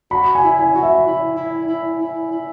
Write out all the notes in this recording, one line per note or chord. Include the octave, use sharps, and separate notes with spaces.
F#4 B5
G#5
E4
G#5
F#4
E5
E4
E4
E4
E4
E4